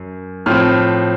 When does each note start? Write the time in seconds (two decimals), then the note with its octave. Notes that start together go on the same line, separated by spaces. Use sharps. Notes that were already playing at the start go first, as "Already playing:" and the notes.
Already playing: F#2
0.46 A2 F3 C4 F6